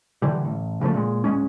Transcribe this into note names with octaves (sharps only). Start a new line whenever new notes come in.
D3 E3 G3
A1
C#3 F3 G#3 A3
A#2 G#3
D1 D2 G#3 C#4